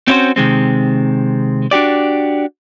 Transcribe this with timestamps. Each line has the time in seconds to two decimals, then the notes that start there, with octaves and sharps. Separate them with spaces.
0.08 C4 C#4 E4 F#4 C5
0.36 C3 D#3 G#3 C4
1.71 D4 F#4 G4 D5